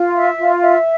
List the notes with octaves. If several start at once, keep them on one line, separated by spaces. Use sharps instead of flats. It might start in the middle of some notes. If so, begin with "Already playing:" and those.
Already playing: F4
E5
F4
E5